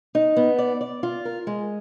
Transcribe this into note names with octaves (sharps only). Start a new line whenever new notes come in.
D#4
B3
D5
D5
F4
A#4
G#3